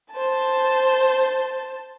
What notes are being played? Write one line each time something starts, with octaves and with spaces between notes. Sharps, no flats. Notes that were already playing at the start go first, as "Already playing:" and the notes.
C5 A5